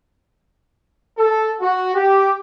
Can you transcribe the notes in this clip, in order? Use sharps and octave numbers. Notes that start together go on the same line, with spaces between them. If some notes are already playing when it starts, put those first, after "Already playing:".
A4
F#4
G4